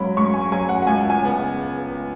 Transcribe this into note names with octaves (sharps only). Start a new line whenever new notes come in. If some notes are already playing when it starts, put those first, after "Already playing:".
Already playing: G#2 F#3 C#4 B5
G#2 C#6
G#5
F#3 C#4 G#5
F#5
F#5
C#2 G#5
G#5
C#3 B3